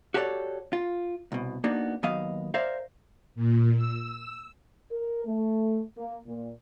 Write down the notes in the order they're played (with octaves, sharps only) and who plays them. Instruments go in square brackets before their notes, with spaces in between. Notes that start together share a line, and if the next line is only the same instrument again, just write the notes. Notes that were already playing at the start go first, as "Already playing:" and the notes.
[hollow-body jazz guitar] F#4 G4 A4 B4 C#5 D5
F4
C2 B2
A#3 B3 D4 D#4 F#4
D#2 F#3 B3 D#5 F5
A#4 C5 D5 E5 F5
[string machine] A#2
E6
[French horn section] A#4
A3
A#3
A#2